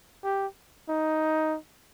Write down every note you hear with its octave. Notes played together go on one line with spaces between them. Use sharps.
G4
D#4